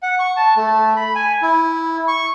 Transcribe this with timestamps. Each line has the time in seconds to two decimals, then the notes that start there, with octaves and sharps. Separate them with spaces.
0.03 F#5
0.19 C#6
0.37 A5
0.56 A3
0.96 B5
1.15 G#5
1.42 E4
2.08 C#6